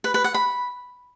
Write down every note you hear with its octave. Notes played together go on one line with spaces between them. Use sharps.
B4
B4
F#5
B5